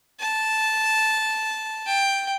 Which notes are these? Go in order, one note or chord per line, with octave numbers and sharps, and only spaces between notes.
A5
G5